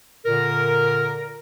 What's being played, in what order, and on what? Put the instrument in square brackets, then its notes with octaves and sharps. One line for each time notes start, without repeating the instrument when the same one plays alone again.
[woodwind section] A#2 D3 A#4